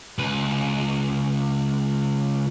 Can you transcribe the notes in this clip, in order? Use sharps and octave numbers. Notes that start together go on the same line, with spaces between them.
C#2 B4